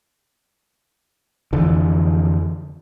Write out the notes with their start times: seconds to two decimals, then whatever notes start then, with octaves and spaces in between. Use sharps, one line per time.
1.53 F2 D3 E3